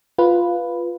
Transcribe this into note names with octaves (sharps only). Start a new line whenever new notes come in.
F4 B4